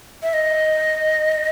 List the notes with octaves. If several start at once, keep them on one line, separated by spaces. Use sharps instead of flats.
E5
D#5